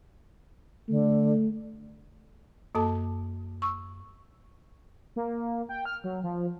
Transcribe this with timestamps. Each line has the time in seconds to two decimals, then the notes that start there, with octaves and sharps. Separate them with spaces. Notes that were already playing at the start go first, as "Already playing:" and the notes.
0.89 D3 A3
2.75 F#2 A#3 A4 A5
3.62 C#6 E6
5.16 A#3
5.69 G5
5.86 F6
6.04 F#3
6.23 F3